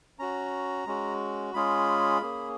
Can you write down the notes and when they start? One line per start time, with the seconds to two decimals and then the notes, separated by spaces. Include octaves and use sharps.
0.19 C#4 F#4 A#5
0.87 G#3 C#4 F#4
1.54 G#3 C#4 F4 G#4 B5
2.22 A#3 C#4 G#4